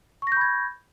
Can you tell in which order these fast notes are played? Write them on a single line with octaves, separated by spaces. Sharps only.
C#6 A#6 G6 B5 G#6